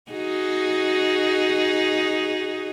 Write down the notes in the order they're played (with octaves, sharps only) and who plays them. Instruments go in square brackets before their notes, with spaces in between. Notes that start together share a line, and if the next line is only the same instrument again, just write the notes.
[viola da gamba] D#4 F#4 G#4